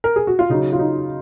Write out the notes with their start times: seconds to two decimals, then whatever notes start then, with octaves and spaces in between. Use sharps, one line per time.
0.04 A#4
0.16 G#4
0.27 F#4
0.39 F4
0.49 C#3 F#3 D#4
0.73 F4
0.79 D#4